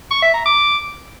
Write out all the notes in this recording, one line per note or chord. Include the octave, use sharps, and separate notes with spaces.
C#6
E5
A#5
D6